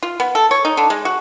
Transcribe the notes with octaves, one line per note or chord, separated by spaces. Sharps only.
F4
B3
A4
C#5
D#4
D3
G#3
F#4